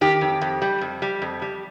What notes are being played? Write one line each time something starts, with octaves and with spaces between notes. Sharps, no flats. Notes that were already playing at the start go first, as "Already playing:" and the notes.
D#3 G4
F2
F2
G3
F2
G3
F2
G3